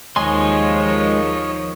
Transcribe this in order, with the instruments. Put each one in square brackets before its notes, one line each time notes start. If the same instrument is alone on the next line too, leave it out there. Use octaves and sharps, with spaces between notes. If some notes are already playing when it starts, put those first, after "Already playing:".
[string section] D#2 D#3 F3 [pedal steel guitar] G#3 G#5 C6 [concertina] C#5 D#5